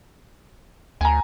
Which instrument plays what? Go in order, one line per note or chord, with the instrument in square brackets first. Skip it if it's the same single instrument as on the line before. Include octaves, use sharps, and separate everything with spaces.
[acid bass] D2 [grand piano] G#5 A#5